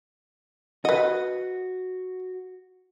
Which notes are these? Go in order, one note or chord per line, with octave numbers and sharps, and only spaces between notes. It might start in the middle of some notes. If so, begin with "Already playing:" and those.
F#4 B4 D#5